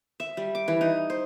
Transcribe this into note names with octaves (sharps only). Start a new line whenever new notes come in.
E5
G3
D6
E3
D#4
C5